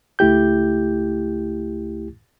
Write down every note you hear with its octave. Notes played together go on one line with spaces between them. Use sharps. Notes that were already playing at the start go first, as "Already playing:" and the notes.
C#2 A3 E4 G4 G6